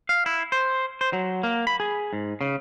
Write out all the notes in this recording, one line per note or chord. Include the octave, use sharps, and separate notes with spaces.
F5
E4
C5
C5
F#3
A#3
B5
G#4
G#2
C#3